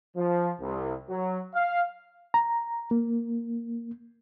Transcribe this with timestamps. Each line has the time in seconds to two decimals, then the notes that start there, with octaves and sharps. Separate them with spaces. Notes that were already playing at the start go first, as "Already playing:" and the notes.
0.16 F3
0.60 C2
1.09 F#3
1.54 F5
2.34 A#5
2.91 A#3